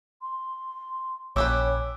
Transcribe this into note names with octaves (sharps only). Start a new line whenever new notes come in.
C6
A#1 C#4 G4 B4 C#5 D6 E6